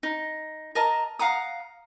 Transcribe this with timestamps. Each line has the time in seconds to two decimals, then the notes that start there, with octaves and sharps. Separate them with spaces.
0.03 D#4
0.75 A#4 D#5 A5 A#5
1.19 F5 F#5 A#5 D#6